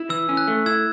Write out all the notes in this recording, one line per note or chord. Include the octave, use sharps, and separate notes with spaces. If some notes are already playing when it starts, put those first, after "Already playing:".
Already playing: E4
E3 E6
C#4
F#6
A3
E4 E6 G#6